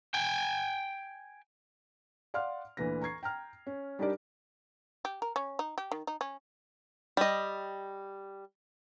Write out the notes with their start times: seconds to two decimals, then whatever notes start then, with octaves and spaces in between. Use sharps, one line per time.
0.14 G5 G#5
2.34 D5 F5 F#5 C6 F6
2.77 D2 A#2 E3 B4 A#6
3.01 A#5 C#6 G#6 C7
3.23 G5 A#5 F6
3.67 C#4
3.99 G3 D4 D#4 G4 A#4 D5
5.05 G4
5.22 A#4
5.36 C#4
5.59 D#4
5.78 G4
5.92 D#3
6.07 D#4
6.21 C#4
7.17 G3 D#5